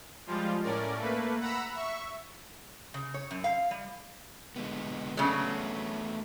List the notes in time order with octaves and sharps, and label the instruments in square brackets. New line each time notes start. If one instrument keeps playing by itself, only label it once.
[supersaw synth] F3 G3 G#3 F4
A2 C#4 A#4 D5
A3 A#3 B4
F#5 A#5 B5 E6
E5 C#6
[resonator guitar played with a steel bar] C#3
C#5
F#2
F5
G3
[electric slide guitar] D3 G#3 B3
[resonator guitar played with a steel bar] C#3 F#3 [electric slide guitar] A3 B3 D4